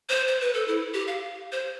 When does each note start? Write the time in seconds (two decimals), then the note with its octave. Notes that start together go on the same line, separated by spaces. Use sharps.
0.09 C5
0.27 C5
0.41 B4
0.54 A4
0.68 E4
0.94 G4
1.07 F5
1.52 C5